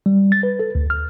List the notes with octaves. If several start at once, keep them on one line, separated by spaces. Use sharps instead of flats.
G3
A6
B4
A4
D2
F6